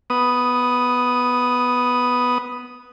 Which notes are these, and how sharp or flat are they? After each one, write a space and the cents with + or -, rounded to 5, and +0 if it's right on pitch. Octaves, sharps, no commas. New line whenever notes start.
B3 +0 D#6 +0